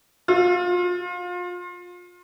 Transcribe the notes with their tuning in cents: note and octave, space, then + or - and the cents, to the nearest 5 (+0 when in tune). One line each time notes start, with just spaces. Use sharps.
F4 +30